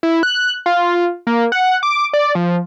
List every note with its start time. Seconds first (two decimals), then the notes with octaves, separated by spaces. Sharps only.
0.03 E4
0.23 F#6
0.66 F4
1.27 A#3
1.52 F#5
1.83 D6
2.13 D5
2.35 F3